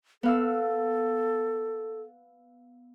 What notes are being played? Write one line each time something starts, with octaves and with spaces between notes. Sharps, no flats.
B3 A4 F5 E6